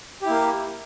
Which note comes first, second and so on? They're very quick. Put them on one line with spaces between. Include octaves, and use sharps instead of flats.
G4 E4 A#3